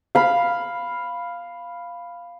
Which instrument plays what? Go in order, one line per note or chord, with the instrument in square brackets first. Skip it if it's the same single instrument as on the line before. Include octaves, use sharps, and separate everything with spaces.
[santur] F5 B5